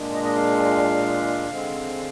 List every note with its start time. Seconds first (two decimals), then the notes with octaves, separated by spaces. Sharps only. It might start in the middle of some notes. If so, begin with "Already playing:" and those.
Already playing: A#2 G#3 D4
0.14 D#5
0.24 D#5
0.36 F5
1.49 D3 G#3 C4